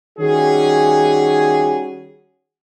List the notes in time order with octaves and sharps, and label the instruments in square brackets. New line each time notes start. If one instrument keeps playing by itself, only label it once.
[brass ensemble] D#3 G3 C#4 F#4 G#4